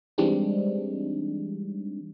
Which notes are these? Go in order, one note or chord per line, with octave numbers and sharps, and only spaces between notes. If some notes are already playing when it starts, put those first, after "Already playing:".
E3 G3 G#3 C4 D4 D#4